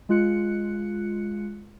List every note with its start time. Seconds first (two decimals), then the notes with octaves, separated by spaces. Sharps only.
0.09 G#3 F4 F#6 C#7